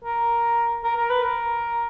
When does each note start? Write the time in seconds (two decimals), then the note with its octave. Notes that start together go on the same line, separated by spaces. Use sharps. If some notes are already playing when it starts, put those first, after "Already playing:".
0.04 A#4
0.84 A#4
0.97 A#4
1.10 B4
1.23 A#4